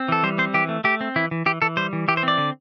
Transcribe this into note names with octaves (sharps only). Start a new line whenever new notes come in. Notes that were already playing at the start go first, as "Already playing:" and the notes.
Already playing: C4
E3 A4
G3 C5
C4 C5
E3 G4
A3
A3 G4
C4
E3 E4
E3
E3 G4
E3 A4
G3 C5
E3
E3 G4
C5
C4 D5
D3